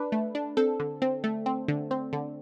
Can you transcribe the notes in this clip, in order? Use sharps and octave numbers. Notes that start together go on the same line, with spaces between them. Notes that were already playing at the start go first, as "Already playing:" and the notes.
Already playing: D4 B4
A3
D4
C4 A4
D3
C4
A3
C4
D3
C4
D3